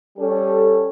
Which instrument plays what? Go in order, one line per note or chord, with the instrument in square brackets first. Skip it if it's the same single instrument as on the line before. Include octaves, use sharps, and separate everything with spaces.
[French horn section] G3 C#4 G4 A4